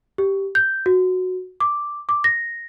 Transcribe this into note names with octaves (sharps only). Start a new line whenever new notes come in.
G4
G6
F#4
D6
D6
A#6